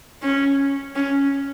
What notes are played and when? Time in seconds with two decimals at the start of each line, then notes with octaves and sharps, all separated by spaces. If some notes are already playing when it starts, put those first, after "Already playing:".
0.22 C#4
0.95 C#4